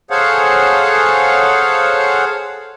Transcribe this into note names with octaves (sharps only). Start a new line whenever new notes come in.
G#4 A4 C5 C#5 F5 F#5